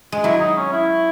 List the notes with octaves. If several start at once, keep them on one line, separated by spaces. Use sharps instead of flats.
G#3
F#3 E4
D#4
C#4
E4